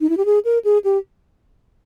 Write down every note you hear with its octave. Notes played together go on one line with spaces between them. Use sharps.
D#4
E4
G4
G#4
A#4
G#4
G4